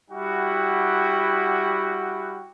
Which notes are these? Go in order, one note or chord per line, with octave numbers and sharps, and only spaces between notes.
G3 E4 F#4 F#5 G5